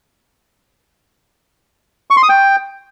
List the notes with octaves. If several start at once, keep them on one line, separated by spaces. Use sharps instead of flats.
C#6
C6
D#6
G5